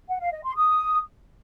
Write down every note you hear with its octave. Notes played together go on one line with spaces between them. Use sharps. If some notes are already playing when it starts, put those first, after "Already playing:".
F#5
F5
D#5
C6
D#6